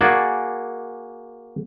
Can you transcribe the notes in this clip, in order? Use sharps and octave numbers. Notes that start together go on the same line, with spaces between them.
A#3 F#4 G#4 D5 G#5 A5